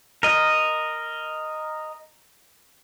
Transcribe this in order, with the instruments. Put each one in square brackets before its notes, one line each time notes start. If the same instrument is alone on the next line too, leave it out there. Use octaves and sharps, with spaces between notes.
[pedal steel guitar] A#4 D#5